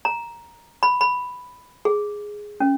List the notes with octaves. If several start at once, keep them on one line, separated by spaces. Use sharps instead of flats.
A#5
B5
B5
G#4
C#4